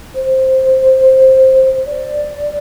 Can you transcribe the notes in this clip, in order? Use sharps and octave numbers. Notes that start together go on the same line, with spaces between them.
C5
D5